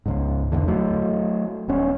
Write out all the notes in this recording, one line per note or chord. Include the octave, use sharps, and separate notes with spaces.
C#2 G#2
E1 A#1 E2 D3
F#3 A3
D#1 B3 C#4